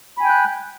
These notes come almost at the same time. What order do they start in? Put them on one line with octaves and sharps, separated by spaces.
B5 G#5 G5 G6 F#6